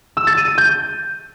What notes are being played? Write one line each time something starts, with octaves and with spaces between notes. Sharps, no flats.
E6
A6
D#7
D#7
G6